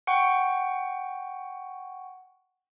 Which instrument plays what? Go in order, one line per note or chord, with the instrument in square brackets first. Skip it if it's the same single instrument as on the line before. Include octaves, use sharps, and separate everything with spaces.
[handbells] F#5 G5 C#6